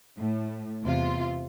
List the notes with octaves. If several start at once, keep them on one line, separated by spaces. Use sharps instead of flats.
A2
E2 C3 F4